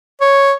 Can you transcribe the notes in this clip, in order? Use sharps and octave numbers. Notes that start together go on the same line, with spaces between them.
C#5